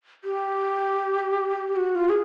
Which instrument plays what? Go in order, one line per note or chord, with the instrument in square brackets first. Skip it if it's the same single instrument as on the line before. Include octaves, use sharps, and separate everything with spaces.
[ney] G4
F#4
F4
G#4